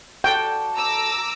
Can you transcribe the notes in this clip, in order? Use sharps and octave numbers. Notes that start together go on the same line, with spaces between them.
F#4 A4 D5 G5
A#5 D6 E6